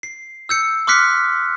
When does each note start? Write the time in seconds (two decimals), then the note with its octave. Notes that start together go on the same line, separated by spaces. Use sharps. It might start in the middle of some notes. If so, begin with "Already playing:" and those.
0.03 C7
0.49 E6 G6 C#7
0.87 C6 D6 F6 F#6 B6 C#7